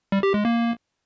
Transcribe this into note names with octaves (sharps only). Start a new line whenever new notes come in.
G3
G4
G#3
A#3